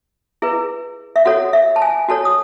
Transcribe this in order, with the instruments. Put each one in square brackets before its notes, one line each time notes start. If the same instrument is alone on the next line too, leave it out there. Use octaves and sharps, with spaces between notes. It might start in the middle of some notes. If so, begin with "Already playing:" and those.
[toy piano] E4 G#4 B4
E5
F#4 A4 C#5 F#5
E5
A5
G#5
F#4 A4 C#5 A5
D#6